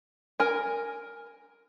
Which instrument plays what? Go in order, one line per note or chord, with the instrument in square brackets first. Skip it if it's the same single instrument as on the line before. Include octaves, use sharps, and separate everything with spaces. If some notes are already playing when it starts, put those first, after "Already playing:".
[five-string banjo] A#4 G#5